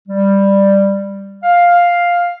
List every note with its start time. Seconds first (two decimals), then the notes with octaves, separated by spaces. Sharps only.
0.08 G3
1.44 F5